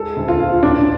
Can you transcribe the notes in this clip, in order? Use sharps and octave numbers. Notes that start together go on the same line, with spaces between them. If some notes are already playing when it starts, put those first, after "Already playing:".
Already playing: G#3 A4
D2
F4
D2
A1 D4